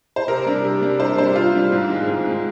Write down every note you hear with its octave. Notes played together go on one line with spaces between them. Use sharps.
C5
C3 A#4
G3 D4
C3
G3 D4
C3 C5
G3 D4 C5
C3 F4
G3 D4
G#2
D#3 G#3 C4
G#2
D#3 G#3 C4